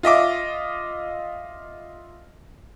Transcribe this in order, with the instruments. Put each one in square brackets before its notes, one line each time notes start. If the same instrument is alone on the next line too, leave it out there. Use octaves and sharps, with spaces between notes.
[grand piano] F4 D#5 E5 D6